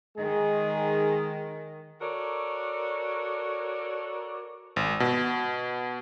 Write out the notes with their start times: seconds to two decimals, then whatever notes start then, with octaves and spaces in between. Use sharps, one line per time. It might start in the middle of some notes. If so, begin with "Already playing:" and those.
0.17 D#3 G#3 G#4
2.00 F#4 A4 A#4 C#5 D5
4.76 G#1
5.00 B2